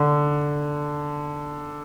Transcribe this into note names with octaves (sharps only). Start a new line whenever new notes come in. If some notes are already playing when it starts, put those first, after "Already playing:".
Already playing: D3